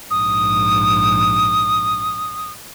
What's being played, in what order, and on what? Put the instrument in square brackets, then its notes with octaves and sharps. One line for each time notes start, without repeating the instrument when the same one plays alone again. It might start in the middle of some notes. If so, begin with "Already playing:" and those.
[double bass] A#1 G#2 [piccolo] D#6